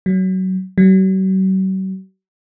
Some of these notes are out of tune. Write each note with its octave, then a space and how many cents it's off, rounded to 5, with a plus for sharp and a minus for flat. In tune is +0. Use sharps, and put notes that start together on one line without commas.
F#3 +20
F#3 +45